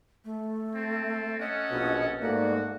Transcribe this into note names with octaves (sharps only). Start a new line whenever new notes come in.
A3
C4 A4
C#4 A4 D#5 F#5
A#1 B2
G#2 A3 A#3 F#4 D5 F#5